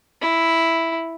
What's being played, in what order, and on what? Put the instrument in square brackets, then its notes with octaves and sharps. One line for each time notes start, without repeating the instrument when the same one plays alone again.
[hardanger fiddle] E4